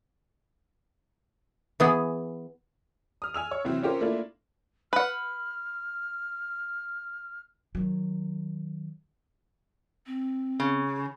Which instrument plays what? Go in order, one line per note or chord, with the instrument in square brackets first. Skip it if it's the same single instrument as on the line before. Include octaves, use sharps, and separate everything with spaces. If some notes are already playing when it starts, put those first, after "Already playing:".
[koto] E3 B3 G#4
[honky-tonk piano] D#6 F6
G#5 E6 F7
C#5
C3 E3 F#3 C4
C#4 F4 G4 A#4 C5
A3 A#3 D4 E4 F4
[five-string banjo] B4 F#5 [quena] F6
[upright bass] D#3 F#3
[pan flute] C4
[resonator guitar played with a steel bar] C#3